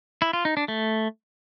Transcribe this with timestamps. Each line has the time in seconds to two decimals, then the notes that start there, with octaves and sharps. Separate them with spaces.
0.22 E4
0.33 F4
0.45 D#4
0.57 D4
0.68 A3